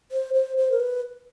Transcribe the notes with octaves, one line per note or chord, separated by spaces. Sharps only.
C5
C5
C5
A#4
B4